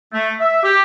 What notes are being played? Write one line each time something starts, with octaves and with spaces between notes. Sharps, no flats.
A3
E5
G4